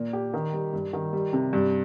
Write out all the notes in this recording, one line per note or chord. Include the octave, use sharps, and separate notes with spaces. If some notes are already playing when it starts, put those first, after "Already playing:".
Already playing: A#2 A#3
G4
D#3
G3
G2
D#3
G3
C3
G2